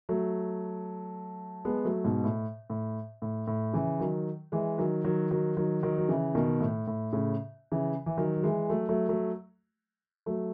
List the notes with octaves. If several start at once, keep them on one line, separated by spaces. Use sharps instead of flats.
F#3 A3
G#3 B3
F#3 A3
G#2 B2
A2
A2
A2
A2
C#3 E3
D#3 F#3
E3 G#3
D#3 F#3
D#3 F#3
D#3 F#3
D#3 F#3
D#3 F#3
F#3
C#3 E3
B2 D#3
A2
A2
A2 C#3
C#3 E3
E3
D#3 F#3
F#3
E3 G#3
F#3 A3
F#3 A3
F#3 A3
F#3 A3